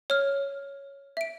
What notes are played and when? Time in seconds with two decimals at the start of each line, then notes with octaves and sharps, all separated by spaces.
0.10 C#5 F6
1.17 E5 D7